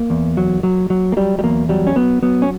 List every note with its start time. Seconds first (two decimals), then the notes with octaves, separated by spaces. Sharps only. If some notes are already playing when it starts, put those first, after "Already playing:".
Already playing: A#3
0.10 E2
0.37 F#3
0.63 F#3
0.90 F#3
1.12 A#3
1.17 F#3 G3
1.39 G3
1.43 E2 A#3
1.69 F#3 G3
1.87 C#4
1.96 F#3 B3
2.22 F#3 B3
2.42 C#4